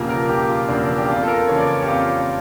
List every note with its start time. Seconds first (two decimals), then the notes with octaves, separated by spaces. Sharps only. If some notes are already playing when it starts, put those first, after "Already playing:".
Already playing: E1 E2 C#3 F3 A#3 F4 G4
0.09 A#4
0.29 E1 G4
0.49 F4
0.68 E2 C#3 F3 A#3 D4
0.98 G4
1.08 F2 F4
1.23 A4
1.28 A#4
1.48 C#3 E3 A#3 C#5
1.58 D5
1.67 C#5
1.82 G4
1.87 F2 F4